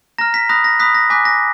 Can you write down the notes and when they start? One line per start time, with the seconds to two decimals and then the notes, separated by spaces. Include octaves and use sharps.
0.18 A#5 F6 A#6
0.34 B6
0.49 B5 D#6 F#6 A#6
0.64 A#6
0.79 B5 D#6 F#6 B6
0.95 A#6
1.10 G#5 D6 F#6 B6
1.25 A#6